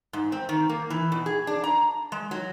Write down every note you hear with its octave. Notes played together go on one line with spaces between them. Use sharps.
G#2
C4
D#3
A#3
E3
B2
G#4
D4
A#5
G#3
F#3